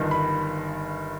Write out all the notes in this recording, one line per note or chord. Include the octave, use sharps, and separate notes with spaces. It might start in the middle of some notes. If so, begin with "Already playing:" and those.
Already playing: G1 G2 D#3
B5